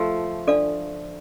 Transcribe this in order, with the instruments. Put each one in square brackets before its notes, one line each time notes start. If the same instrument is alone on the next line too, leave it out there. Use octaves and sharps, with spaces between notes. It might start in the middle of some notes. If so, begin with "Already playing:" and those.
Already playing: [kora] F3 A3
[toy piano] D4 A4 D5 F5